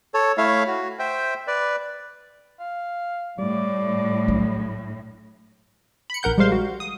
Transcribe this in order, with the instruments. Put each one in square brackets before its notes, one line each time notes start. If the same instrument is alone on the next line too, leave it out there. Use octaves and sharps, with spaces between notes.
[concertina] A4 C#5
A3 E4 C#5 E5 F5
F#4
C5 E5 G5
B4 D5
[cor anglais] F5
[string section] A2 [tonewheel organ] G3 [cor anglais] D5
[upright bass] F#3 D4
[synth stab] B5 C#7
A#1 A#4 F#5 G6
A#1 G3 G#3 C5 F5 C6
F#4
D#6